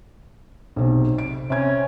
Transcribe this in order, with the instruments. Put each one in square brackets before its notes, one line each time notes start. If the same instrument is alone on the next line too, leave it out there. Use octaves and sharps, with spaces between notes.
[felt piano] B1 C3
D7
[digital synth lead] C3 [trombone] C#4 [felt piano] E5 G#6